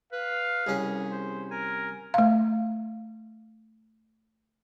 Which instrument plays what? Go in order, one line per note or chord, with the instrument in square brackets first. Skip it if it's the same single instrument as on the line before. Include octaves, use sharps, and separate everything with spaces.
[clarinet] B4 [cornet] F5
[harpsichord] C2 C#4 [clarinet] G#4
[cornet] C5
[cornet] A#4 [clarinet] G#5
[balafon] A3 F5